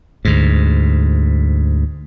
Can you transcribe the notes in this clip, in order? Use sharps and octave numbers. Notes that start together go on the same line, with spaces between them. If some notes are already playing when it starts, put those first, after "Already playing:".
D2 G#2